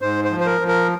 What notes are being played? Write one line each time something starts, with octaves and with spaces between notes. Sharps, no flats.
G#2 C5
C5
F3
C5
A#4
F3
A#4